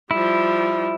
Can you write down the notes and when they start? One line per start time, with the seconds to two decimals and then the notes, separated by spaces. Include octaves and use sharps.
0.11 F3 G3 E4